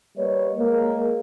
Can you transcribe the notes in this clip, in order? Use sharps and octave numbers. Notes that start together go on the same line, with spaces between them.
G3 A#3 B4 C#5 D#5
G#3 A#3